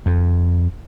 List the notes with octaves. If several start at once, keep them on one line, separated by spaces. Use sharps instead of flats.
F2